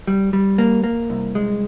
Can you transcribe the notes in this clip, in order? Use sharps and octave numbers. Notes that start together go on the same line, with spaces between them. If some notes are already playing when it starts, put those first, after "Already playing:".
G3
G3
A#3
A#3
C2
G#3